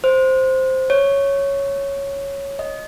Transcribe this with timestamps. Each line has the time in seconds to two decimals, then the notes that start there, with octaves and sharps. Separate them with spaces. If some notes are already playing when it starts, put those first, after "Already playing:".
0.04 C5
0.90 C#5
2.59 D#5